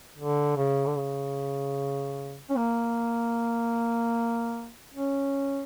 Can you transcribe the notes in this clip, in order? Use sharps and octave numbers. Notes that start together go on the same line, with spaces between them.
D3
C#3
D3
C#3
C#4
A#3
C#4